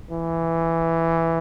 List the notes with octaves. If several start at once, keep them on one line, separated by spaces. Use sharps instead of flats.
E3